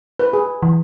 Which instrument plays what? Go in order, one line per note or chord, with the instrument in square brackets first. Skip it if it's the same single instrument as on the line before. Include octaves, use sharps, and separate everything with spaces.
[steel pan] B4
G#4
[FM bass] E3